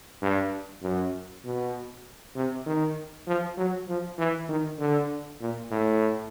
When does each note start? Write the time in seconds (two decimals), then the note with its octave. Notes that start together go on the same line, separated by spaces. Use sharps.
0.22 G2
0.83 F#2
1.45 B2
2.36 C3
2.66 D#3
3.27 F3
3.57 F#3
3.89 F3
4.18 E3
4.49 D#3
4.79 D3
5.41 A#2
5.71 A2